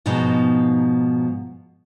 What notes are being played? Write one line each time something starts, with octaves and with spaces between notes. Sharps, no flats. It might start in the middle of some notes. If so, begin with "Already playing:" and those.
G#2 B2 F3 B3 D#4